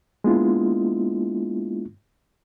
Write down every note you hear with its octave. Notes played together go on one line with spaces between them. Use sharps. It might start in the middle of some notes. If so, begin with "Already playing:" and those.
G#3 A#3 B3 D4 E4 F4